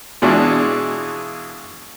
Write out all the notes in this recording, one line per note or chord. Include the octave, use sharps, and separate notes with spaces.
B2 E3 G#3 D4 F4 F#4